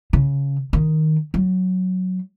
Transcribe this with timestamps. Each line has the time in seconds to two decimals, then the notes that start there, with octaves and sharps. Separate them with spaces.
0.13 C#3
0.73 D#3
1.34 F#3